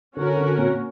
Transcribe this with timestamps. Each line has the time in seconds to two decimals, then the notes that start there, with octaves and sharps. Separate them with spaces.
0.16 D3 C#4 F#4 A#4
0.37 D3
0.58 A#2